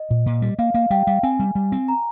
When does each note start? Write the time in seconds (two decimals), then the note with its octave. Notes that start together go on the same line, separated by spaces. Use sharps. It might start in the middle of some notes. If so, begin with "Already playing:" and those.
Already playing: D#5
0.11 A#2
0.26 A#2
0.42 G3
0.59 A#3 F5
0.74 A#3 F5
0.90 G3 G5
1.07 G3 F5
1.23 C4 G#5
1.39 G3
1.55 G3
1.72 C4
1.88 A#5